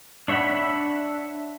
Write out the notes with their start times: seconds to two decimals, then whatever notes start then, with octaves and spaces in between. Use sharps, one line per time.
0.28 D4 C#5 E5 F#5 B5